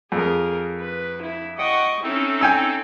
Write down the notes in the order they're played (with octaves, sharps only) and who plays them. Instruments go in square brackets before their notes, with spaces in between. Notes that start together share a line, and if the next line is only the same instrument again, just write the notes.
[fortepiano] F2 [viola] G#4 A#4
[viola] B4
E4
[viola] D#5 C#6 [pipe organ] F#5 G5
[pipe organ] C4 D#4 A4 [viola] C#4 E4
[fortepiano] G5 G#5 E6